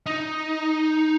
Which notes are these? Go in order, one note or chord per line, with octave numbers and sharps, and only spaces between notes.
D#4